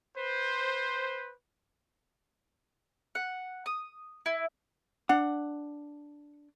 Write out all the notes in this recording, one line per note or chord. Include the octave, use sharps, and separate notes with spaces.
B4 C5
F#5
D#6
E4
D4 F#5